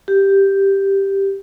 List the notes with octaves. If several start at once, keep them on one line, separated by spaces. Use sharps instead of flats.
G4